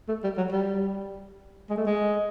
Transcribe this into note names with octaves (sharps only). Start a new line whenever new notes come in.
A3
G3
F#3
G3
G#3
A3
G#3